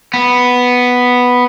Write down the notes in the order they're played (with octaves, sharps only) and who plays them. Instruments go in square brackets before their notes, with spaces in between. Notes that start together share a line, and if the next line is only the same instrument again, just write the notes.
[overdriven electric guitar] B3